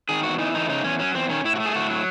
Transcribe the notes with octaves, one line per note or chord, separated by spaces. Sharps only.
D#3 G#4
E2 F#4
E3 D#4
A3 D#4
C#3 D#4
E2 C#4
F#3 C#4
E2 C4
D#3 C#4
A2 E4
F#4
A3
G#4
A2 F#4
F#3